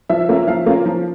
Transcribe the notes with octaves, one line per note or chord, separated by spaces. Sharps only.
F3 E5
A#3 C#4 F4
F3 F5
A#3 C#4 F4
F3